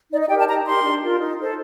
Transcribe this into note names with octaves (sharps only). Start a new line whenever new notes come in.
D#4 D5
D#5
G4 A#4 G5
A5
D#4 A#5
G4 A#4 C6
D4
F4 A#4
D#4
A4 C5